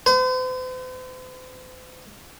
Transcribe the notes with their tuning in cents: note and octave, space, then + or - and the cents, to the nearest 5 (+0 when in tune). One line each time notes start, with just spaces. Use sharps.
C5 -45